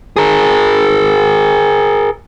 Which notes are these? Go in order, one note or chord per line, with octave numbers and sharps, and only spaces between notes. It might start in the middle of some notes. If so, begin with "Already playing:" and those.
G#4 A#4